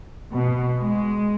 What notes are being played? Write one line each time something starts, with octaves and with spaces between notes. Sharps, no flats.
B2
G#3